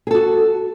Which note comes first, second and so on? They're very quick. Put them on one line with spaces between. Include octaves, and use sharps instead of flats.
G#4 A4 F#4